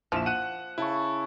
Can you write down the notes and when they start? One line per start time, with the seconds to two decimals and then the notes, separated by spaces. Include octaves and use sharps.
0.12 A#1 F3 E4 E7
0.26 F#5 F#6 D#7
0.78 C#3 E4 A5 C#6